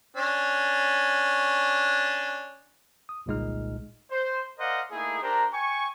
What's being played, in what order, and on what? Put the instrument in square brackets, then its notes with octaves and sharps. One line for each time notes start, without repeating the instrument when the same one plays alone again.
[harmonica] C#4 D4
[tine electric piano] D#6
G1 C2 A#2 G#3 D#4 F6
[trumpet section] C5
A#4 C5 D5 D#5 F5 F#5
A3 A#3 D#4 E4 G#4
D4 G4 A#4 C5 A#5
G5 G#5 C#6